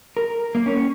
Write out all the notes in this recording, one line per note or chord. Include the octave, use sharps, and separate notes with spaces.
A#4
A#3
C#4